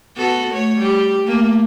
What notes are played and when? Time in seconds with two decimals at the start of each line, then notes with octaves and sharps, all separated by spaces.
0.17 B3 F#4 A4
0.50 A3 C#5
0.79 G3 G4
1.24 A3 A#3